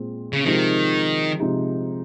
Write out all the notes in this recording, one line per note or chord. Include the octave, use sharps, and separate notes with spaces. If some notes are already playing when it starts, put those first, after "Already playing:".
Already playing: A#2 G#3 C4
C#3
C3 D#3 F3 G#3 D#4
C3 F3 G#3 D#4